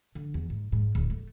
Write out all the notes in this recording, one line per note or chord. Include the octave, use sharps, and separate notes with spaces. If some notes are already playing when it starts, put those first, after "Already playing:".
D3
E2
G#2
G#2
D1
A3